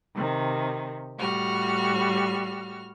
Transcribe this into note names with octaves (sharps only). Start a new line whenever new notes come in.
C3 D#3
A2 G3 F#4 F6